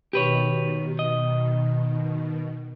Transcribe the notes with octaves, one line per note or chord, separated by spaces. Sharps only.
B2 D#3 G4 B4 C#5
D#5